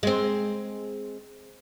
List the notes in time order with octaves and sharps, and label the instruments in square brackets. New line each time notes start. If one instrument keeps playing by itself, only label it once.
[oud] G#3 C4